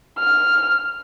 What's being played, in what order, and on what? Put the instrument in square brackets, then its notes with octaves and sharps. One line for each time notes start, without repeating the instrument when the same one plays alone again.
[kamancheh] F6